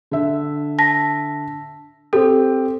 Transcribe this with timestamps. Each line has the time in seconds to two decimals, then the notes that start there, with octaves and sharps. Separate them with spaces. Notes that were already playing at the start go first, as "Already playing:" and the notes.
0.11 D3 E5
0.78 A5 A#6 B6
2.13 C4 G4 A4